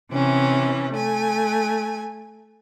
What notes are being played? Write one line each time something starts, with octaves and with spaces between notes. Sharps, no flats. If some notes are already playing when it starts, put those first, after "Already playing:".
C3 E3 C#4
A3 G#5